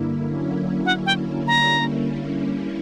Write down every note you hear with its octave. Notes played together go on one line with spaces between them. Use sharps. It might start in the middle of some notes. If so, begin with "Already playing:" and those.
Already playing: G2 D3 A#3 E4
D3 F#3 A#3 C#4 E4
F#5
G5
D3 G3 A#3 C#4 E4 A#5